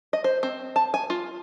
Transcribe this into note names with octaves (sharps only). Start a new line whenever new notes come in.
D#5
C5
C4
A5
G#5
F4